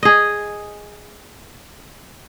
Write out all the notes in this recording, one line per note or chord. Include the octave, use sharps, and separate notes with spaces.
G#4 D#5